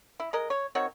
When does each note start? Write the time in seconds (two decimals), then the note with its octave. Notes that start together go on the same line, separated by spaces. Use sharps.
0.20 E4
0.33 G#3 A#4 D#5
0.50 C#5
0.75 D#3 C4 F#4 C#5